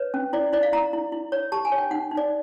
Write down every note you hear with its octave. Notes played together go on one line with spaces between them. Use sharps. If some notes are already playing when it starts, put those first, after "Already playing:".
Already playing: B4 C#5
C#4
E4 D5
E4 D5
F5
E4 A#5
E4
E4
C#5
G4 A5
G#5
C#5
G5
D#4 F#5
D#4
D5